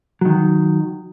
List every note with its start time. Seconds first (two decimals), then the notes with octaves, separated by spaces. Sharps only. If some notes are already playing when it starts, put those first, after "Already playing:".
0.21 D#3 F#3